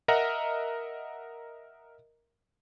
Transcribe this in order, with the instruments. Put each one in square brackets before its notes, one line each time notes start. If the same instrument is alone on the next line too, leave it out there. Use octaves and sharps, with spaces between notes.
[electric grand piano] A#4 D#5 E5 F#5 A#5